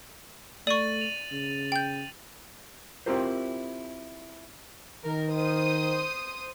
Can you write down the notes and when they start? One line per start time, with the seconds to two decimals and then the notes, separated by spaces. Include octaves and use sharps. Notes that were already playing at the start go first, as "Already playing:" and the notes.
0.67 A3 D5 C#6 A6 D#7 F#7
1.01 F7
1.32 C#3
1.72 G5 G6
3.06 C4 E4 F4 G4 A#4 C5
5.04 D#3 A#4
5.34 C5 D#6